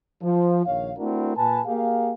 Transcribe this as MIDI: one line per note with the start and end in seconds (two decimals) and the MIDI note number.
0.22 0.62 53
0.66 0.91 34
0.66 0.91 51
0.66 0.91 73
0.66 0.91 77
0.97 1.36 57
0.97 1.36 60
0.97 1.36 62
0.97 1.36 64
0.97 1.36 66
0.97 1.36 70
1.37 1.60 46
1.37 1.60 71
1.37 1.60 80
1.37 1.60 81
1.65 2.12 58
1.65 2.12 67
1.65 2.12 68
1.65 2.12 70
1.65 2.12 77